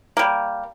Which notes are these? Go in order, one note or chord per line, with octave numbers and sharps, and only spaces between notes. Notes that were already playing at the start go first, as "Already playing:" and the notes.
G3 A#3